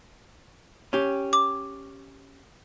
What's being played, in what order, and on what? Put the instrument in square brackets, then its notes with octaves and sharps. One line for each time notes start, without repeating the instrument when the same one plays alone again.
[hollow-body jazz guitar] C#4 G4
[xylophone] D6